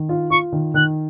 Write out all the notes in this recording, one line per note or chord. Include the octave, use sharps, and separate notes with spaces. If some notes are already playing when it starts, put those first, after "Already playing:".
Already playing: D#3
F4
F4 C#6
D#3
D#3 F#6